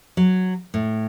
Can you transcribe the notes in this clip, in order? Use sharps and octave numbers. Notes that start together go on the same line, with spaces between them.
F#3
A2